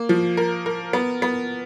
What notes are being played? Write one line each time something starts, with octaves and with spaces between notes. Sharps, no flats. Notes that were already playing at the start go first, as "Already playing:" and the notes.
Already playing: A#3
F3
A#4
A#4
B3
B3